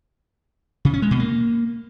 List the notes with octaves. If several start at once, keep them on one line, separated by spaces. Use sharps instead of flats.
C#3
C#4
G#3
B2
A#3